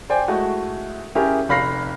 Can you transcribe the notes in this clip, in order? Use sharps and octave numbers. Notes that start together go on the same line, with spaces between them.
C5 D5 G5 G#5
G#3 A3 E4 F#4
C#4 E4 G4 G#4 A#4
F1 F5 B5 F6 A#6 C7